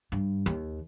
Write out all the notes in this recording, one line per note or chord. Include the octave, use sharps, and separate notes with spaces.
G2
D#2